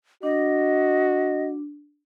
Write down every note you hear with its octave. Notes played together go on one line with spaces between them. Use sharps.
D4 F#4 D#5